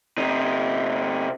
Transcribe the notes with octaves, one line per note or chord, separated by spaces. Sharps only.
C3 D#4